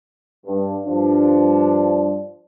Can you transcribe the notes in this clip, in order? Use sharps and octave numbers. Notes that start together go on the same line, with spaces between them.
G2
G2 F3 D4